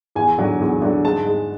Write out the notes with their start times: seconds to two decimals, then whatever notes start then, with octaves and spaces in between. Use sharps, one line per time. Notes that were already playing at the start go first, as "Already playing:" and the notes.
0.15 E2 G#5
0.38 D3 F#3
0.59 E2
0.82 D3 F#3
1.05 G#2 A5
1.26 G#3